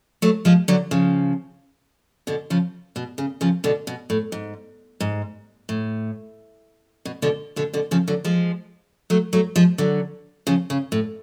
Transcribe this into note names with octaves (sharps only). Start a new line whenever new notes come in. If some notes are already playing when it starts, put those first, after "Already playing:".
F#3 A3
F3 G#3
D3 F#3
C#3 F3
B2 D3
C#3 F3
B2
C#3
C#3 F3
B2 D3
B2
A2
G#2
G#2
A2
B2
B2 D3
B2 D3
B2 D3
C#3 F3
D3 F#3
F3 G#3
F#3 A3
F#3 A3
F3 G#3
D3 F#3
C#3 F3
C#3
A2